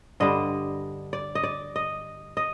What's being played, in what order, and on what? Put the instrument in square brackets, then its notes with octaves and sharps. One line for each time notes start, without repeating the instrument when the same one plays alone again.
[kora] G2 D3 G3 D4 D#5
D5
D#5
D5
D#5
D#5